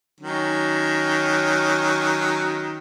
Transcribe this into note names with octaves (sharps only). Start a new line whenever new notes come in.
D#3 F#3 C#4